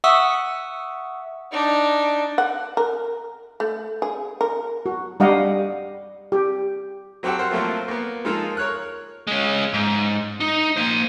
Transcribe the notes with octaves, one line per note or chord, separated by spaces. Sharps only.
E5 F#5 C#6 D#6 E6
D4 D#4
F#5
A#4
A3
G#4
A#4
F#4
G3 D4 G4 D#5 F5 F#5
G4
F#3 C4 F#4 G4 A4
A#4 C5 F#5
F3 F#3 A3 A#3 C4 F4
A#3 B3
F3 G#3 D#4 F4 A4 A#4
A#4 C#5 F#6
G#3 C#4
G#2
D#4
A#3 C5